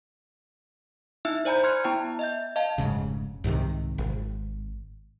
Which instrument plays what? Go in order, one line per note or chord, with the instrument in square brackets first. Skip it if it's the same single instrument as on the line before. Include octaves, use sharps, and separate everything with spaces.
[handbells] D#4 E4 E5 E6
C5 D5 G#5 A#5 B5 G6
C6 F6 F#6 G#6 C#7
B3 E4 G5 A5 A#5
D#5 E5 G6
D#5 F5 A5
[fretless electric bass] F1 G#2 C#3
C2 G#2 C3 D#3
G#1